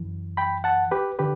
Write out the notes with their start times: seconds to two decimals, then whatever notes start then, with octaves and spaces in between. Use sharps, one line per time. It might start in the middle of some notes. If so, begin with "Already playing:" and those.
Already playing: F#2 E3
0.37 G5 B5
0.64 F#5 A5
0.91 G4 B4
1.19 D3 G4 B4